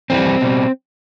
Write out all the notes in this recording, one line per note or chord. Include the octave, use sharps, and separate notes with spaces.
F2 E3 G3 C4
B2 G3